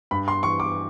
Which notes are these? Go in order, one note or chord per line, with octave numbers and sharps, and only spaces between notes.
G2 B5
C6
E3 C#6
D6